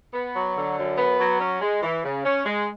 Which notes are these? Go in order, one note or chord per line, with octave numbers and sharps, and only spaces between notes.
B3
F#3
D3
F#2
B3
F#3
C#4
G#3
E3
C#3
C#4
G#3